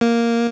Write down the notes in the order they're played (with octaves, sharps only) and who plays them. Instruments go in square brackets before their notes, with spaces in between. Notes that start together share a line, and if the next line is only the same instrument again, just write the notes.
[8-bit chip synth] A#3